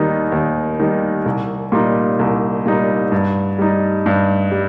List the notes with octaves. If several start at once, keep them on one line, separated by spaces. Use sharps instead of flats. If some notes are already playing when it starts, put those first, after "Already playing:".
Already playing: D#2 D#3 G3 D#4
D#2
D#3 G3 D#4
C2
A#2 G3 D#4
C2
A#2 G3 D#4
G2
G3 D#4
G2
G3